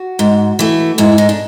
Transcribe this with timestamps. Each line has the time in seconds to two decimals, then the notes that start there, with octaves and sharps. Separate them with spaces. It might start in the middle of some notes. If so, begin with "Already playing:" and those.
Already playing: F#4
0.19 G#2
0.59 E3 A3
0.98 G#2 E4
1.18 D#4
1.29 D4